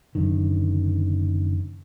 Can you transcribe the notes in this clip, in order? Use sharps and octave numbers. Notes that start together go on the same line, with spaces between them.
F#1 F#2 D3 D#3